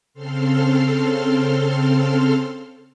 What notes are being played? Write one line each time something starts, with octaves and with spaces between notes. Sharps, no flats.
C#3 C4 A4 C6 F6